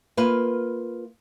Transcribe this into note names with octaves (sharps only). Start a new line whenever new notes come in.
A#3 F4 B4